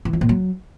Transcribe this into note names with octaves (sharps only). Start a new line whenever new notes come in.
E3
F2
A#2
F#3